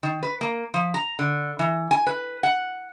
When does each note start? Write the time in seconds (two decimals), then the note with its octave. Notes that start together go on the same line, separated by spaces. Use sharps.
0.03 D#3
0.23 B4
0.41 A#3
0.74 F3
0.94 A#5
1.19 D3
1.59 E3
1.91 G#5
2.07 B4
2.43 F#5